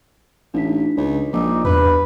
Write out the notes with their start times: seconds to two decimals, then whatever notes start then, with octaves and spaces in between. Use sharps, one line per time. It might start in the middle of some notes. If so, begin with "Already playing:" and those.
0.54 A1 D4 D#4 B6
0.97 C#2
1.33 A#1 D#4 D6 E6
1.65 E2 G2 B4